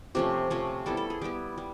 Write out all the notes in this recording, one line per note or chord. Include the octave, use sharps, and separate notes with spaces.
C3 F3 A3 C#4 G4
C3 F3 A3 C#4
G3 B3 E4 A4
A4
G#4
G3 B3 E4 G4
G3